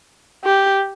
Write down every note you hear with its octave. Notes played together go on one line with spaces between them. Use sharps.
G4